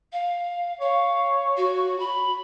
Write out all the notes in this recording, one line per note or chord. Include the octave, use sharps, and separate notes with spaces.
F5
C#5 F5
F#4
B5